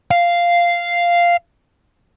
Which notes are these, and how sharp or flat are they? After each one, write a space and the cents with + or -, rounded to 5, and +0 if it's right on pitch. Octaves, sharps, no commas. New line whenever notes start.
F5 -5